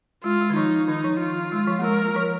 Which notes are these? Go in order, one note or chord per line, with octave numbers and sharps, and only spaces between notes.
G#3 F4
G#3
D#3
F3 D#4
D#3 D#4
F3
F4
G#3
F3
A#3
G#3 A#4
F3